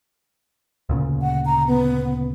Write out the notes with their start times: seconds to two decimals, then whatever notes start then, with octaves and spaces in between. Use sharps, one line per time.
0.89 D2 A#2 C#3
1.22 F#5
1.46 A#5
1.67 B3